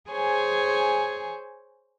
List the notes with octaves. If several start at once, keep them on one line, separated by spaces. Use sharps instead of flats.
G#4 C5 C#5 G#5